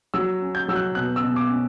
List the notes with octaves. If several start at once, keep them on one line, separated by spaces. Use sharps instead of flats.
F#3 E6
C#4
G6
F#3 E6
F#6
B2 F#6
E6
B2
D6
C#4